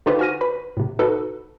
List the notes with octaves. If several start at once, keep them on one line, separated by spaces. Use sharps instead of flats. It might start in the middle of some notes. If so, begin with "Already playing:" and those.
D3 D#4 F4 G4 B4 C5
F#4 G#5 F6 A#6 D#7
B4 B5
A2 C3
D#4 F#4 A4 B4